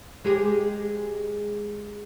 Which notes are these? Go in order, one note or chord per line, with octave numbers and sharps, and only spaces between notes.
G#3 G4 G#4